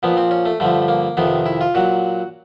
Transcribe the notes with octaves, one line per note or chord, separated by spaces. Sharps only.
A#2 F3 B3
C4
C#4
A3
G2 D3 F3 A3
A#3
F2 C3 D#3 B3
E4
F4
A#2 F#3 F#4